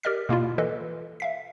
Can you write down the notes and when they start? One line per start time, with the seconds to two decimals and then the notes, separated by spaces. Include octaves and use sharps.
0.03 G4 A#4 D5 D#5 F6 B6
0.29 B2 A#3 E4 F4
0.58 E3 A4 B4 D#5
1.20 E5 F5 B6